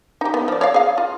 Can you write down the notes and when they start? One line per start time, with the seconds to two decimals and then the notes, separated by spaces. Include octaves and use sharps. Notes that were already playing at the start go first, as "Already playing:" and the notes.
0.21 D#4 G4
0.34 B3
0.48 F3 D5
0.61 C#5 D5 F5
0.74 G#4 F5
0.98 F4